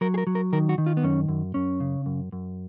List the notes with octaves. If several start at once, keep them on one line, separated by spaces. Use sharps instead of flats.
F#3 A#4
G#4
A#4
F#3
A#4
D#3 A#4
F#4
D#3
F4
B3
F#2 C#4
F#2
F#2 C#4
C#3
F#2
F#2